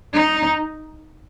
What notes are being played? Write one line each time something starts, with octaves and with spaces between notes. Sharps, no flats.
D#4